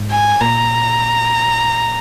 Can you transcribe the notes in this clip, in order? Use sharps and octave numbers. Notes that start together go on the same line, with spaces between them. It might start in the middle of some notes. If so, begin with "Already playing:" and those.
Already playing: G#2
G#5
A#2 A#5